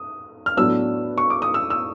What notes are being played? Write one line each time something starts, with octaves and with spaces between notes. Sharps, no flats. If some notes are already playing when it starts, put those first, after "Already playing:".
Already playing: D#6
F6
A2 F#3 B3 D4 E6
C#6
D6
D#6
E6
E6